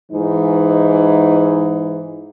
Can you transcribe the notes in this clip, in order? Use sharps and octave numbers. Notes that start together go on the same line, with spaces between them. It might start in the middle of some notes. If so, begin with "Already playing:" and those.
G#2 E3 D#4